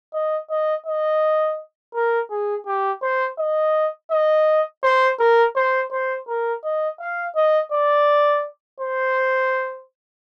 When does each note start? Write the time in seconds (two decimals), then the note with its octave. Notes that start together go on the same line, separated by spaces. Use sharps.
0.14 D#5
0.50 D#5
0.86 D#5
1.94 A#4
2.30 G#4
2.67 G4
3.02 C5
3.38 D#5
4.11 D#5
4.84 C5
5.19 A#4
5.56 C5
5.92 C5
6.28 A#4
6.64 D#5
7.00 F5
7.36 D#5
7.72 D5
8.80 C5